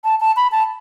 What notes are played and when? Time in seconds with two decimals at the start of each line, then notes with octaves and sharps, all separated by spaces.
0.04 A5
0.21 A5
0.37 B5
0.52 A5